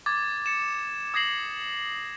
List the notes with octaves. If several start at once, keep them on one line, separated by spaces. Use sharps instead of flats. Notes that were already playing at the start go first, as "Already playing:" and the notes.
D6 G#6 A6
A6 C#7 E7
D#6 G#6 A#6 C7 F#7